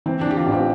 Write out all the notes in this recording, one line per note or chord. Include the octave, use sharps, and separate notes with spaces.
E3 C4
D4
E3 G4
F4
A1
C4